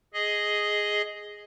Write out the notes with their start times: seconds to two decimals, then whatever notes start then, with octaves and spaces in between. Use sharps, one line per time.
0.14 G#4 D#5